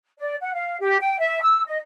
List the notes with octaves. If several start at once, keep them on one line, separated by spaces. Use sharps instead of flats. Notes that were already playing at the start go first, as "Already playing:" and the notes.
D5
F#5
F5
G4
G5
E5
E6
D#5